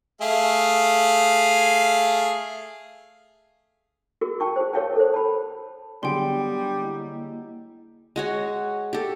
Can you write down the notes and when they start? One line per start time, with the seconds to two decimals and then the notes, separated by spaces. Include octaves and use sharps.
0.21 A3 G#4 F5
4.21 F#4 G#4 A#4
4.40 G5 A5 C#6
4.56 G#4 C5
4.73 G4 A#4 C#5 F5 G5 A5
4.96 A4 C5
5.14 A5 B5
6.03 D3 F#3 G3 B3 G#4 G5 C6
6.81 A#3 E4 D#5
8.16 G#3 F#4 C#5
8.93 G4 A4